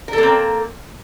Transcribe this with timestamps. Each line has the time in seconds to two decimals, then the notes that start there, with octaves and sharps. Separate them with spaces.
0.08 A#4
0.13 A4
0.18 A#3
0.23 C4